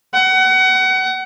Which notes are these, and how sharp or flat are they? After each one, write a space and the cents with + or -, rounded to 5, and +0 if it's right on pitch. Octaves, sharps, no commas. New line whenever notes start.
F#5 +30